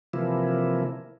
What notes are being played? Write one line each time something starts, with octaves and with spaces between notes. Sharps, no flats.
C3 E3 F3 A#3 E4